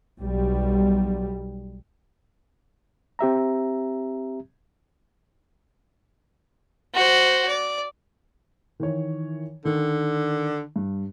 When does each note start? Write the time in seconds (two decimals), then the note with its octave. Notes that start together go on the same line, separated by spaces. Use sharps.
0.20 B1 G3
3.19 C4 G4 E5 A#5
6.95 F#4 C5
7.48 D5
8.80 D#3 E3 C#5
9.65 D3 D#3
10.76 G2